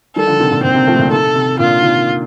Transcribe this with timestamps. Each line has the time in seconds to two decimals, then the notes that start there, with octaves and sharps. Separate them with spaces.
0.16 D#3 G3 A4
0.27 D3 F3
0.39 C3 D#3
0.51 A#2 D3
0.64 A#2 C4
0.75 C3
0.87 F3 A3
0.99 A#2 D3
1.11 C3 D#3 A4
1.35 C3
1.59 A#2 D3 F4
1.82 C3 D#3